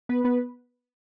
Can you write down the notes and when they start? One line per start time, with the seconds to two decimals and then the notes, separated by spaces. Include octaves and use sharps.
0.09 B3 B4
0.24 B3 B4